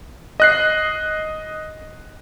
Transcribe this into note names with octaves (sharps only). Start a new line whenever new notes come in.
D#5 F#6 C7